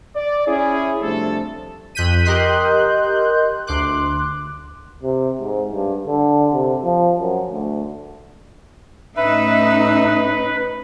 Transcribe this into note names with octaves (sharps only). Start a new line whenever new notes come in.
D5
C#4 E4 G#4
C3 F3 G3 A3 D4 A4
F2 F#6 G6 B6 D#7
G4 A#4 D#5 C6 F#6 G6
D2 C6 D6 F#6
C3
G#2
G2
D3
C3
F3
F#2
D2
A2 C#4 D#4 B4 E5